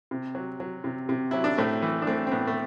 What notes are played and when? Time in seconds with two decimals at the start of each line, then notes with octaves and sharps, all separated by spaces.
0.11 C3
0.35 F#3
0.60 F#3
0.84 C3
1.09 C3
1.31 F#3 E4
1.44 D4
1.58 A2 A3 C4
1.82 E3
2.02 D4
2.07 E3 A3 C4
2.27 C4
2.32 A2 B3
2.47 A3